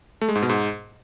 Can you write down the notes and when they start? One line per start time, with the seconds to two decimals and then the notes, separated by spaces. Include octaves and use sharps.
0.21 A3
0.28 G#3
0.35 G#2
0.42 B2
0.49 G#2